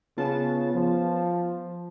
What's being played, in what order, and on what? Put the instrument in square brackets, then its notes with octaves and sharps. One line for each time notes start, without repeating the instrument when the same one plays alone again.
[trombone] C#3 [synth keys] B3 F4 A5
[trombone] F3